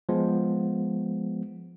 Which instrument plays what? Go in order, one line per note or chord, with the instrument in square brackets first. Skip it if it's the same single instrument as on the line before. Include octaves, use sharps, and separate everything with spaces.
[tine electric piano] F3 G#3 B3